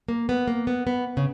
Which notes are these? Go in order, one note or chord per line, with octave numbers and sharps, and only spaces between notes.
A#3
B3
A#3
B3
B3
C#3